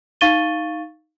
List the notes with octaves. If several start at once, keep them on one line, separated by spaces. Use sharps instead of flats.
D#4 F5 C#6 A6 D#7 G7